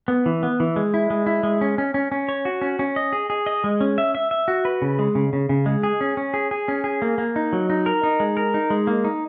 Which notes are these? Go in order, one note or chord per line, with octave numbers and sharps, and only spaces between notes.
B3
E3
B3
E3
G#3
E4
G#3
E4
G#3
C#4
C#4
C#4
C#4
C#5
F#4
C#4
C#4
D#5
G#4
G#4
D#5
G#3
C#4
E5
E5
E5
F#4
B4
C#3
G#3
C#3
C#3
C#3
G#3
G#4
C#4
C#4
G#4
G#4
C#4
G#4
A#3
A#3
D#4
F#3
D#4
A#4
D#4
G#3
A#4
D#4
G#3
A#3
D#4